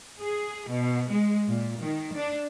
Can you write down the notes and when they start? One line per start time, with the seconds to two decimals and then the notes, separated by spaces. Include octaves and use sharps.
0.21 G#4
0.70 B2
1.11 G#3
1.49 A#2
1.81 D#3
2.14 D4